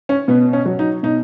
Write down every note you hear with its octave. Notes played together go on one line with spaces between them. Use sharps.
C#4
B2 B3
C#4
F#3
D#4
B2 D#4